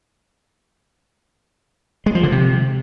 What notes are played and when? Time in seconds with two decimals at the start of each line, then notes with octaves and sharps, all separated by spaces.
2.06 G#3
2.15 F3
2.23 D3
2.32 C3